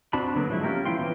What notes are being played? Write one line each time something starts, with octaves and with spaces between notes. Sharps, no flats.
C4 D4 F#4 A5 B5
D3 F#3 A#3 B3
F3 F#3 G#3 E4
C#4 F4 G4 A#4
E3 E4 F5 G5 C6
E3 F3 B3